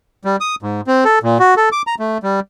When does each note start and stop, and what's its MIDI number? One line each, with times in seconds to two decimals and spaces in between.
0.25 0.36 55
0.41 0.55 87
0.62 0.81 44
0.87 1.04 60
1.05 1.19 69
1.23 1.38 46
1.39 1.54 66
1.57 1.69 69
1.72 1.82 86
1.87 1.95 82
2.00 2.18 57
2.23 2.40 55